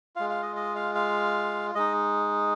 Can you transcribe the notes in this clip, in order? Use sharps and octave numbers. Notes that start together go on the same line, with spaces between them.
G#3 F4 F5
F5
D#5
D#5
F5
F5
G#3 D#4 D#5